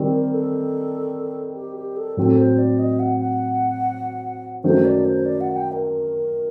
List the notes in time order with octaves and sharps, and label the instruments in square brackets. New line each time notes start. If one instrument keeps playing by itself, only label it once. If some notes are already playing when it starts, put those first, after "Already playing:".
Already playing: [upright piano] D#3 G3 C4
[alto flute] A#4
A4
G4
G4
A4
[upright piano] A2 F#3 C4 [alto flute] A4
[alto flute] C5
D5
D#5
F#5
F#5
[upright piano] F#2 D#3 F#3 A3 [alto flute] C5
[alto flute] D5
C5
D5
F#5
G5
A#4